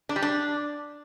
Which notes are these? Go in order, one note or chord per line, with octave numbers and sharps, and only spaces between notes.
D4
G3
D4